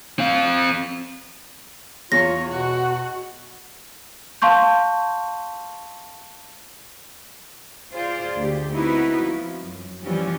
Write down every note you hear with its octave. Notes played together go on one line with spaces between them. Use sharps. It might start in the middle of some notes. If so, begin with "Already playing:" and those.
C4 F5
E2 F4 C#5 A#6
B2 F#4
F5 A5 C6 C#6 G6
F4 G#4 C5 D5
D2 G4
B3 C4 D#4 E4 F#4 B4
F3
F#2
E3 F3 G3 C#4 G4